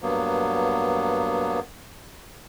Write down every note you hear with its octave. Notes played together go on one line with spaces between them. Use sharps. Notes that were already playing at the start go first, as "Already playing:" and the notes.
G2 F#3 A#3 B3